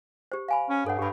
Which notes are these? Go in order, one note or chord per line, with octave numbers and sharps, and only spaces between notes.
G4 C5
F5 G#5 B5
C#4
G2 A4 C#5 F#5
G2 G4 B5